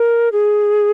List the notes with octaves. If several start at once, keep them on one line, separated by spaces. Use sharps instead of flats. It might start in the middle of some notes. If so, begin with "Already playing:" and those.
Already playing: A#4
G#4